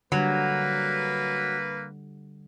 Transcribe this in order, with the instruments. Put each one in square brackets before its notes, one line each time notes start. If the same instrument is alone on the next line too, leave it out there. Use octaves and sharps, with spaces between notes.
[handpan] D3 G3 [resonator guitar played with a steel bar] F#3 [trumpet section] A#3 B4